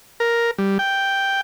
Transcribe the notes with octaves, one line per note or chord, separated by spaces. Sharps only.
A#4
G3
G5